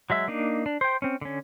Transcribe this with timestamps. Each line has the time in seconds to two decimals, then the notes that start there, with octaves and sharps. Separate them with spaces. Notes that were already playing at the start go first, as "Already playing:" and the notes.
0.10 F#3 G#3 E5 E6
0.28 A#3 D4 D#4
0.66 D4
0.81 C5 G5
1.02 C4 C#4
1.21 D3 C#4